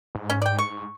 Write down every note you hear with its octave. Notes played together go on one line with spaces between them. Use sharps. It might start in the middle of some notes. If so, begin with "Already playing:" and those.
G#2
C#4
D5 G5
C#6